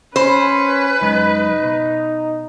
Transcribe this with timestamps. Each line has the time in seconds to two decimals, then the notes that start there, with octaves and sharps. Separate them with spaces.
0.16 C#4 B4 C5 B5
1.01 C#2 F#2 G#3 D#4
1.62 B2